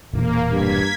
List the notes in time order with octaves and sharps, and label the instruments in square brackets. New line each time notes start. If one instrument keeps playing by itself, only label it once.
[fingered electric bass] E1 A#2 E3 [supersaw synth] A#3
[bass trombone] G2 [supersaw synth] G#6 B6